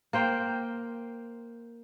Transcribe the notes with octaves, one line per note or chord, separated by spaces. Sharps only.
A#3 C5 G5